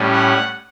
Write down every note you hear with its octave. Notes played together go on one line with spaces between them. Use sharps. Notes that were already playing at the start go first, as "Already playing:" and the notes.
Already playing: A2 G3 C#4
F#5